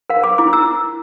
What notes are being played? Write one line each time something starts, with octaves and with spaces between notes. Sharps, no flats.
A#4 F5
A#4 D6
E4 D6
E4 E6